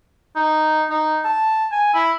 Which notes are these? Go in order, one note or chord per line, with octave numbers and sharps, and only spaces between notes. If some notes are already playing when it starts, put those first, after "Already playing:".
D#4
D#4
A5
G#5
E4